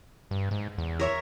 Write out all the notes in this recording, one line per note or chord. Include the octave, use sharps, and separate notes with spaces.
G2
G#2
E2
A#4 C#5 E5